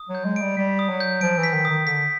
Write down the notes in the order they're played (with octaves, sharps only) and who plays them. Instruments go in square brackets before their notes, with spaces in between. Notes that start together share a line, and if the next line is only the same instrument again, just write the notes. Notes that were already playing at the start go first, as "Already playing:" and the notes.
Already playing: [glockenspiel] D#6
[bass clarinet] F#3
[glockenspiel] G6
[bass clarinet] G#3
[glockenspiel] D7
[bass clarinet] G3
[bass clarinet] G3 [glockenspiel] B6
[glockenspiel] D#6
[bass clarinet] F#3
[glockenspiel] G6
[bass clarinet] F3 [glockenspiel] D7
[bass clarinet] E3
[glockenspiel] B6
[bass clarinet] D#3
[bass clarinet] D#3 [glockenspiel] D#6
[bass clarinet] D3 [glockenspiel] B6